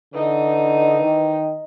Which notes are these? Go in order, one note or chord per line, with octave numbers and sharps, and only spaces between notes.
D3 E3 D#4
D#3